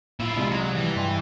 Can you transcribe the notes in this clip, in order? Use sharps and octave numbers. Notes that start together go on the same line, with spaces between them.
A#2 E4 F4
C2 G#3
F#3
E3 G3
G2 G5 G#5 C6